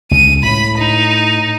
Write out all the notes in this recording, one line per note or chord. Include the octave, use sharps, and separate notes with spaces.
C#2 D#7
A2 B5
D#4